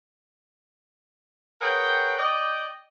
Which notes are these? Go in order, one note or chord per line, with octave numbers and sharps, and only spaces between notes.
G#4 A#4 B4 C#5 F#5 G5
D5 D#5 G5